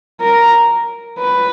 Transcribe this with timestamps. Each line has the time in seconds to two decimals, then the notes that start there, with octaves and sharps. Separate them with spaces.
0.21 A#4
1.18 B4